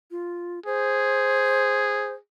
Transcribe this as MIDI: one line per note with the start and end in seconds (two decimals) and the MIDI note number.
0.11 0.60 65
0.66 2.18 68
0.66 2.13 72